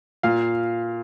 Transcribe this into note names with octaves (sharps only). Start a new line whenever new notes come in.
A#2 F5